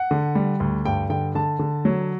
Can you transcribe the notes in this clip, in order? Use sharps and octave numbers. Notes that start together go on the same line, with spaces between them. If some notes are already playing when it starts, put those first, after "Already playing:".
Already playing: F#5
D3
G3
D2
G2 G5
D3 G5
D3 A5
D3
F#3